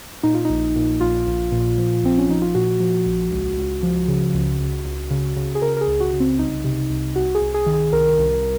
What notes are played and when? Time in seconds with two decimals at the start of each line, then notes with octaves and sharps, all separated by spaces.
0.23 A#2 D#4
0.34 F4
0.45 A#1 D#4
0.76 A#2
1.00 A#1 F4
1.27 A#1
1.52 A#2
1.78 F3
2.03 A#1 C4
2.18 C#4
2.29 F3 D#4
2.42 F4
2.55 A#2 F#4
2.80 F3
3.06 A#1
3.31 C#2
3.57 C#2
3.83 F3
4.08 C#3
4.34 C#2
4.60 C#2
4.85 C#2
5.11 C#3
5.36 C#3
5.55 G#4
5.62 C#3 A#4
5.77 A#4
5.81 G#4
5.88 C#2
6.00 F#4
6.13 C#3
6.20 C4
6.39 C2 D#4
6.64 C3
6.90 C2
7.16 C2 F#4
7.35 G#4
7.41 C2
7.54 G#4
7.66 D#3
7.73 G#4
7.92 C2 A#4
8.18 C2